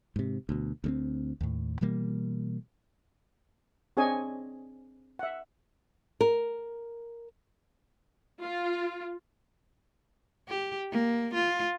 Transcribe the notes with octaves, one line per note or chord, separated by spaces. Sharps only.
G#2 C3
D2 B2
D2 G#3 C4
D#2 A2
B2 E3 G3 A#3
C4 D4 G#4 C#5 D#5 G#5
E5 F#5
A#4
F4
G4
A#3
F4